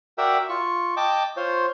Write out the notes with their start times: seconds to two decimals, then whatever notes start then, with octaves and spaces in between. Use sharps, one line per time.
0.18 F#4 A#4 D5 E5 G5
0.49 F4 C#6
0.97 D#5 G5 A5 D6
1.37 F4 C5 C#5